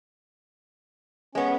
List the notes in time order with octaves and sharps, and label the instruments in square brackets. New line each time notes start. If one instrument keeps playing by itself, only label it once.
[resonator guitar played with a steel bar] G#3 B3 [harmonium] C#4